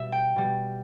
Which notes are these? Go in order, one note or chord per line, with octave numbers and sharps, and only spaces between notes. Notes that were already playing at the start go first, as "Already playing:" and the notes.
Already playing: B2 G3 E5
G5
B2 G3